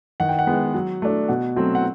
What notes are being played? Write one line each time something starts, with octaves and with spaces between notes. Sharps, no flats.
D#3 F#5
G5
F#5
G#3 B3
F#3
A3 D4
B2 F#5
F#3 A3 C4
F#5